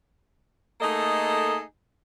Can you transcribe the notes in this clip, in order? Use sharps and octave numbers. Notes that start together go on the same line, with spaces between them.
A3 A#3 D#4 G#4 A4 D#5